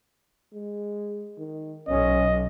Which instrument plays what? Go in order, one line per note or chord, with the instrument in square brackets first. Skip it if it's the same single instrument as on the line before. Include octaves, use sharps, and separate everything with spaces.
[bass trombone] G#3
D#3
[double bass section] B1 [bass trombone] C#4 [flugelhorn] D#5